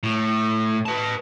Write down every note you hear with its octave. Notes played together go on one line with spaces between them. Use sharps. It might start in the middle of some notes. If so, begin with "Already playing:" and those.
A2
B4 A5